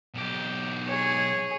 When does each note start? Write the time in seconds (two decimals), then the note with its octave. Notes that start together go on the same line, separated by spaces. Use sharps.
0.14 B1 G4
0.86 G#4 C#5